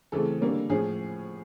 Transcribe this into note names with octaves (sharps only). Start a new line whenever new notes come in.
C#3 E3 A3 C4 A4
D3 G3 A#3 C#4
A2 F3 C#4 G#4